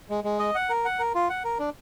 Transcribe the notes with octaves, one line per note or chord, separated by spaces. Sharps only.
G#3
G#3
D#5
F#5
A#4
F#5
A#4
F4
F#5
A#4
D4